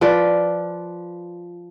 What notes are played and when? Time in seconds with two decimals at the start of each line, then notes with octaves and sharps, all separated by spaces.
0.01 F3 F4 B4 D5